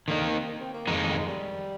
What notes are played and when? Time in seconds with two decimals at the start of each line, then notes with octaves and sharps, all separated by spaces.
0.08 D3 D#3 A#3 D#4
0.21 C4
0.35 C4
0.47 A#3
0.61 C4
0.73 A#3
0.87 F2 D#3 G#3 D#4
1.18 G#3
1.28 G3